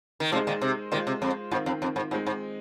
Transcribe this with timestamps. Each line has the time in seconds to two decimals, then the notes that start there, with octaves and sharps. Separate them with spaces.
0.20 D#3
0.32 C3 F3 G#3 D#4 G#4 C5
0.47 A#2 D#3
0.61 C3
0.92 A#2 D#3 G#3 F4 C5
1.07 C3
1.22 F2
1.51 G#2 D#3 C4 F4
1.66 F2
1.82 F2
1.96 G#2
2.11 G#2 G#3 C4 D#4
2.27 G#2